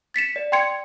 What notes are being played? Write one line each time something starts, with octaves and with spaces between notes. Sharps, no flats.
A6 B6 C#7 E7
D5
G5 C6 G#6 C#7